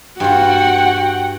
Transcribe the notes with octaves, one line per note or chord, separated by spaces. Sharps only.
G2 F4 F#4 F#5 G5